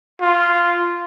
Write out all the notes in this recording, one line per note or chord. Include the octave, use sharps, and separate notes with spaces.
F4